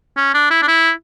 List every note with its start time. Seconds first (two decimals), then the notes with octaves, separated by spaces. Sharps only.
0.17 C#4
0.34 D4
0.50 E4
0.62 D4
0.68 E4